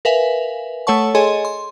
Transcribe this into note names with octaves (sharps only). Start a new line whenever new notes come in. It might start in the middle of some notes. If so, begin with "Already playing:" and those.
A#4 B4 E5 F5 G#5
A3 A4 C#5 F#5 A5 C#6
G#4 A4 C#5 D#5 G#5 C6
C6